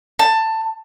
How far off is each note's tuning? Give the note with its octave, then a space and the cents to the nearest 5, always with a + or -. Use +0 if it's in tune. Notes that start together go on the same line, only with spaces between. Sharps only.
A5 +15